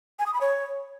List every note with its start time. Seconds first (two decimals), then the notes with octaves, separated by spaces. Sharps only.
0.19 G#5
0.26 D#6
0.34 B5
0.41 C#5